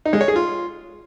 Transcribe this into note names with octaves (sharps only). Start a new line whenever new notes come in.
D#4
G#3
C#5
G#4
F4